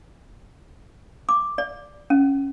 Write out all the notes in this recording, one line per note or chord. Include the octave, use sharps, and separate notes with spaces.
D6
D5
C#4